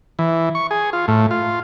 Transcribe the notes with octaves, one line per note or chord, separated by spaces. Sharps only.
E3
C#6
G#4
F4
A2
F4